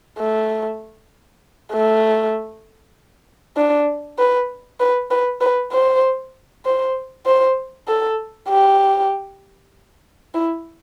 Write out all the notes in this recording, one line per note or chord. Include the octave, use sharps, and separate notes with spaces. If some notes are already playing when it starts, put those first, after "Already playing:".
A3
A3
D4
B4
B4
B4
B4
C5
C5
C5
A4
G4
E4